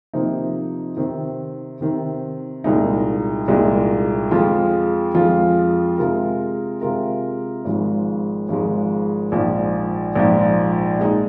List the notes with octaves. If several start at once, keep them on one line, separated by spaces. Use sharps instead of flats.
C3 F3 A#3 D#4 C5
C3 D#3 C4
C3 D#3 C4
C2 A#2 G#3 D#4
C2 A#2 G#3 D#4
F2 F3 G#3 F4
F2 F3 G#3 F4
C3 G#3 F4 A#4
C3 G#3 F4 A#4
G#1 G#2 F3 G#3
G#1 G#2 F3 G#3
A#1 G#2 F3
A#1 G#2 F3
A#2 G#3 D#4